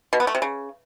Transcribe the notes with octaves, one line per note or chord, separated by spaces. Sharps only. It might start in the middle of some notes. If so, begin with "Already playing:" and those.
B2
B3
A3
C3
C#3